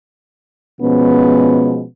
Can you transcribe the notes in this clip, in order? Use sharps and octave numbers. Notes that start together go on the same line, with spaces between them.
B2 F3 G#3 B3 C#4